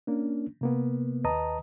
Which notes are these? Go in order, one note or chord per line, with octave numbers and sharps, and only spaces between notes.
A#3 C#4 D4
C3 A#3 B3
D#2 B4 D#5 A5 A#5 D#6